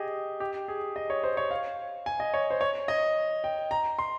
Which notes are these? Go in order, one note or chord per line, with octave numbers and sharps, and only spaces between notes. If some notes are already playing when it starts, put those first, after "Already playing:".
Already playing: G4 G#4 D#5
G4
G#4
D#5
C#5
C5
C#5
F5
G#5
D#5
C#5
C5
C#5
D#5
G5
A#5
C6